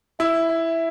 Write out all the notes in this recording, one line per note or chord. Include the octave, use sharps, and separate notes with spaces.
E4 E5
E5